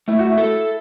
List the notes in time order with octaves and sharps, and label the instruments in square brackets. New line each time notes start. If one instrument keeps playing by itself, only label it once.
[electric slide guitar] A3 [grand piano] E4
[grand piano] F#4
E4
[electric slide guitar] A4